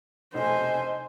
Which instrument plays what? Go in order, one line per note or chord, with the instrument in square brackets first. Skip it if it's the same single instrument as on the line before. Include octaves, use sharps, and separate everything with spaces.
[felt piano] F1 B1 [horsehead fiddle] C5 G#5 [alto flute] D#5